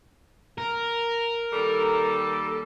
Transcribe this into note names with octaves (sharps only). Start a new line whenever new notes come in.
A#4
D#2 G3 A4